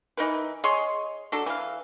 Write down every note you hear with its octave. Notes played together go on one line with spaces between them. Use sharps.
E3 D#4 A#4 B4
G#4 C#5 D#5 C6
F#3 D4 A4
E3 F5